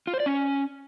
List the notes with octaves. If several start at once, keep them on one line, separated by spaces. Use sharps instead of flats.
F4
C5
D5
C#4